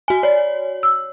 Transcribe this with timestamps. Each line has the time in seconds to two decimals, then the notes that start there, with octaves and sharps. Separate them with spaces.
0.08 F#4 G#5
0.23 C#5 D5
0.83 E6